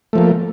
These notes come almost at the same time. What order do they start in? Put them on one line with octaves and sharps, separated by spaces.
A3 F3 A#3